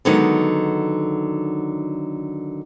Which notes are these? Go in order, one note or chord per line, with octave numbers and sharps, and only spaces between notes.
D3 D#3 F#3 G#3 B3 D#4